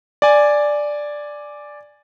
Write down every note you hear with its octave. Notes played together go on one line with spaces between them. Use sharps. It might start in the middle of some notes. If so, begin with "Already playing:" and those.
D5 G#5